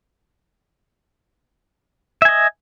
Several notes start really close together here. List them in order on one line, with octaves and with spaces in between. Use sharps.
E5 G#5 D#5